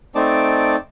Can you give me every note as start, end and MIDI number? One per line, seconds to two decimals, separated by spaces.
0.15 0.76 57
0.15 0.76 60
0.15 0.76 63
0.15 0.76 74
0.15 0.76 81
0.15 0.76 86